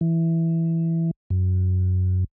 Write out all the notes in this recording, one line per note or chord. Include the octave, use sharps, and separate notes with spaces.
E3
F#2